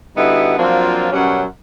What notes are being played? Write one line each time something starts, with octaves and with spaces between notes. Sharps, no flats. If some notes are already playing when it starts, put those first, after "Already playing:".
D3 G3 B3 D#4 E4 F#4
F3 F#3 A#3 C4 D4 F4
F#2 B2 G3 C#4 C#5 F#5